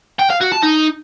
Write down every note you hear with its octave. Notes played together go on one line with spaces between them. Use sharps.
G5
F5
F#4
A5
D#4